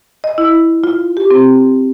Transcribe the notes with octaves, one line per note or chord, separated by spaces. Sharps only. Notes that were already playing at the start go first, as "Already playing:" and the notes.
D#5
E4
F4
G4
C4